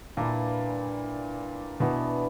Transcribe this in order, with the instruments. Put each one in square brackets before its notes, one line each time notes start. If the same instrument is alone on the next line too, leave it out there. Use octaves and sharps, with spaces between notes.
[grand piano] A#2 [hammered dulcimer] E3 G3 A#3 D4
[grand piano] B2 [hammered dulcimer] E3 B3 D4